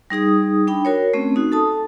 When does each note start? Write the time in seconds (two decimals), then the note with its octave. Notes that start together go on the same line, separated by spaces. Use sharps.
0.10 G3 D#4 G#4 D#6
0.67 D4 G5 B5
0.85 F#4 A#4 C#5
1.14 A3 C4 C#4
1.36 D#4 F#4
1.52 A4 A5 D#6